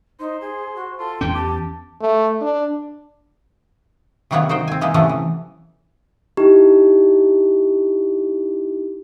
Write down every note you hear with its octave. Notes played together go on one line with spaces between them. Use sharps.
D#4 C5
G#4
F#4
F4 A4
E2 E3 C#4 G5
G4 A5
A3
D4
C3 D#3 F#3 A#3 B3 C#5
D#4 F#4 C5 G5
C4 G#5
E3 G#3 A#3 D#4 B4
C3 E3 F#3 A3 B3 C#4
E3
D#4 E4 G4